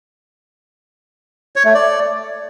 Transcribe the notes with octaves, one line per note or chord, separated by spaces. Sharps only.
C#5
A3
D5